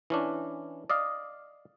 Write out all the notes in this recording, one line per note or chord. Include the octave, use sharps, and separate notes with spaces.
E3 C#4 D4
D5 D#5 F5